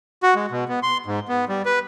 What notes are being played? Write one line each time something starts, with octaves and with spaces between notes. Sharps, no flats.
F#4
G#3
B2
B3
C6
G#2
B3
G3
B4